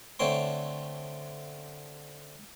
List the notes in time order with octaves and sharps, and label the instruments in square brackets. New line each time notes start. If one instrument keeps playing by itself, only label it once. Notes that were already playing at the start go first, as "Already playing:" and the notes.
[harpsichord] D3 A3 C4 C#5 C6